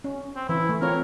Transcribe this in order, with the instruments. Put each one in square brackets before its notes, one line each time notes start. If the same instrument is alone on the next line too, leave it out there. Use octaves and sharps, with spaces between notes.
[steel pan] C#4
[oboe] C4
[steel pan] E3 [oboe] E4
[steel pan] A3
[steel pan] C4 F4 C#5 [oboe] A#4